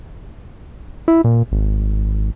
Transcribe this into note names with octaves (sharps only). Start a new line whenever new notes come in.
E4
A#2
G#1